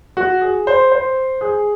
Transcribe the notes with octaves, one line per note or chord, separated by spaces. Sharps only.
F#4
G#4
C5
C5
G#4